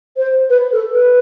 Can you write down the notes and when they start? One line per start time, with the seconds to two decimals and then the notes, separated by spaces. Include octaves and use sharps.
0.17 C5
0.50 B4
0.72 A4
0.94 B4